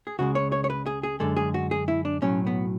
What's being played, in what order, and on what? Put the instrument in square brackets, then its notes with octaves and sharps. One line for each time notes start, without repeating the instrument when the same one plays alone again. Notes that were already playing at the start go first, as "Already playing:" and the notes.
[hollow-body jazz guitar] G#4
C#2 C#3 G#3 F#4
C#5
C#5
C#5
B4
G#4
G#4
F#2 D3 G#3 A4
G#4
F#4
G#4
E4
D4
B1 A2 F#3 C#4
B3